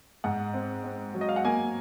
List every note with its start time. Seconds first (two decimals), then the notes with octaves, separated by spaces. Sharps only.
0.24 G#2 F#5
0.54 C4
0.84 C4
1.14 F#3
1.21 D#5
1.29 F5
1.36 F#5
1.44 A#3 G#5